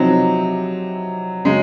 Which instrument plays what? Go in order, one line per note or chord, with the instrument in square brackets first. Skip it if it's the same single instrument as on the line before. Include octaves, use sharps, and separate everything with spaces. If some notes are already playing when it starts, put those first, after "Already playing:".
Already playing: [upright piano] C3 F3 C4 D#4 [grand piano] F#3
[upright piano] C#3 F#3 C#4 [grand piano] G#3